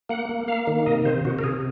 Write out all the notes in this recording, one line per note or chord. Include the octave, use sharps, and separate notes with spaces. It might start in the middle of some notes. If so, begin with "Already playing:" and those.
A#3 F#5
A#3
A#3 F5
D#3
C3 D#5
C3 C5
C3 F#4
A#4
C3 G#4